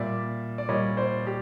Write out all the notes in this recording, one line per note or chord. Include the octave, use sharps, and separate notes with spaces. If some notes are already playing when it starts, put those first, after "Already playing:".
Already playing: A#2 G3 D5 E5
D5
A#2 G3 C#5 D#5
C5 D5
G4